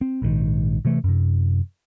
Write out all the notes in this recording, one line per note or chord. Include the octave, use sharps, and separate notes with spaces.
C4
A#1 G#2 D3 D#3
C3 E3 A3
F#2 C3